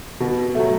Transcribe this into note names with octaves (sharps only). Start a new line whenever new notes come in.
B2
F#3 A3